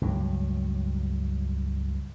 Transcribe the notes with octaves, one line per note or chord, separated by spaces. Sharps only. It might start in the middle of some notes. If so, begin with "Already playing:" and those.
C#2 G2 F#3